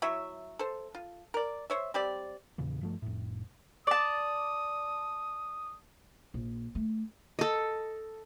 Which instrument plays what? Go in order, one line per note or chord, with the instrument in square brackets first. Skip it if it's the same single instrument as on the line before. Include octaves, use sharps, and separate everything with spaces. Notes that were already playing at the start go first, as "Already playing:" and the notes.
[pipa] F#3 E4 C#5 E5
A4 C5
F4
A#4 D5
C5 C#5 E5
G3 C4 G4 D5
[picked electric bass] E2 A#2 C#3 E3
G2 F3 A3
F1 A2
[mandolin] D5 A5 [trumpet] D#6
[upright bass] A#1
A3
[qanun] A4 D#5